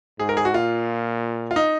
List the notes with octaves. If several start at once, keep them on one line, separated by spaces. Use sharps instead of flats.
G#2 G#4
A#4
G#4
F#4
A#2 F4
F4
D#4